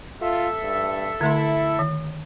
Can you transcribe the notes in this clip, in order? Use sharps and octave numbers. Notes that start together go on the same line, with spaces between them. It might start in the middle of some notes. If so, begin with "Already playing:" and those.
F4 A4 E5
G2
D3 A3 E4 C6
D#3